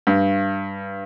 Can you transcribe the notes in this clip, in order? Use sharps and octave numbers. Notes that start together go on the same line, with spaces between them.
G2